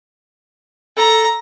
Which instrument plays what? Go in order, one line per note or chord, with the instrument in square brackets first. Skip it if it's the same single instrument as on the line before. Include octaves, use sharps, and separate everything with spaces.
[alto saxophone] A4 [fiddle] A#5